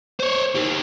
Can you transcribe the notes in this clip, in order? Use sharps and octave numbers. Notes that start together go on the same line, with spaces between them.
C5 C#5
D#4 G4